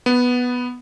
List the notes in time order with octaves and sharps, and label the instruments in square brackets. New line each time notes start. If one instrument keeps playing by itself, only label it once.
[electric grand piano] B3